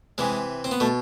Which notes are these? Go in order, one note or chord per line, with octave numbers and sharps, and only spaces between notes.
C3 E3 G#3
C4
B3
B2 A3